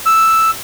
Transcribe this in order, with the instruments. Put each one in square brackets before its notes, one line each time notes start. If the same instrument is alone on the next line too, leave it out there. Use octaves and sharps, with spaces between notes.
[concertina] E6